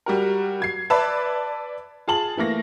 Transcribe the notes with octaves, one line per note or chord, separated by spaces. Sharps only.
G3 F#4 A#4
F#3 G#6 C7
B4 D5 E5 A5 B5
F4 G#4 A5 F#7
E3 A3 A#3 A#6